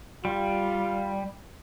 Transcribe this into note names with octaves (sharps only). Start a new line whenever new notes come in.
G3 F4